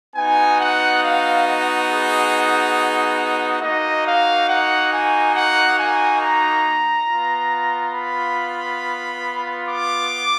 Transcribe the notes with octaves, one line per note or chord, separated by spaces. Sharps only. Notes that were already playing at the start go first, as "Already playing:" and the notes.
B3 D#4 F#4 G#5
F#5
F5
D#5
G#4
A#3 D#4 F#4 D#5
F5
F#5
G#5
F#5
G#5
A#5
B3 F4
B5
D6